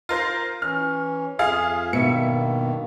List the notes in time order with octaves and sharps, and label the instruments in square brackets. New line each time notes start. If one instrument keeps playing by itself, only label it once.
[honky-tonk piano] F4 A#4 C5
[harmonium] E3 C#4 [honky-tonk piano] F6
[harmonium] F2 E5 [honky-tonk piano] F4 G#4 F5
[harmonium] G2 D#3 A#3 [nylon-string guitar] B2 [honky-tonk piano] E5 C#7